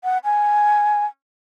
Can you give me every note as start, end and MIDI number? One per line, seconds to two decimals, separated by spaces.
0.04 0.18 78
0.24 1.05 80